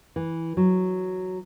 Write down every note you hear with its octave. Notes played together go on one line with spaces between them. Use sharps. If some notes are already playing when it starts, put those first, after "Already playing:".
E3
F#3